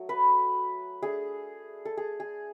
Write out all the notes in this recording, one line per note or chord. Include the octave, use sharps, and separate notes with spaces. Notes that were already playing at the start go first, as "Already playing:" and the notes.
Already playing: F#3 A3
B4
A3 D4 G#4
A4
G#4
G#4